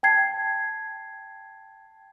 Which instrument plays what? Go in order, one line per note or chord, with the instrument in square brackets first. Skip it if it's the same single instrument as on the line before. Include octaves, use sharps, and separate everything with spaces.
[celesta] G5 A5 G#6 C7